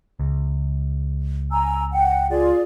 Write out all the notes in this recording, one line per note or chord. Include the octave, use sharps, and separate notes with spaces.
C#2
G#5 A#5 E6
F#5 G5
F4 G#4 D5